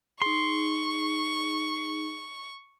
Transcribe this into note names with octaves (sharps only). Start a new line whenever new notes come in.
D#4 G#4 C6 C#6